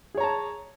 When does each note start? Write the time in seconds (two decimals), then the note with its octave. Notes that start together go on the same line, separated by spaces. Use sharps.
0.15 G#4
0.17 C#5
0.20 A#5
0.23 A5